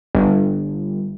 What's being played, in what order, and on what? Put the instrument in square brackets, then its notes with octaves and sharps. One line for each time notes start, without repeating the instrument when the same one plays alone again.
[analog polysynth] G1